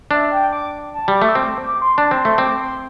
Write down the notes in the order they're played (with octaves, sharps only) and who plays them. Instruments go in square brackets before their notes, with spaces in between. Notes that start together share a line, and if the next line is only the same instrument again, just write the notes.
[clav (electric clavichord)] D4 [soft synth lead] E5
[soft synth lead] G5
D6
A5
[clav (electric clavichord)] G3
[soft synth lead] D6
[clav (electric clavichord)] A3
[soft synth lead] E6
[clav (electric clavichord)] C4 [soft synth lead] D6
[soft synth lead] D6
C6
[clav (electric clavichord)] D4 [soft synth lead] A5
[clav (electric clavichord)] C4
[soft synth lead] C6
[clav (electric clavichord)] A3
[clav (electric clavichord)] C4 [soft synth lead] D6
[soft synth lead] C6